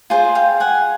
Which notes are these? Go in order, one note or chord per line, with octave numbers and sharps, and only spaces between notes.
F4 G#4 C5
F5 G5
F#5 G#5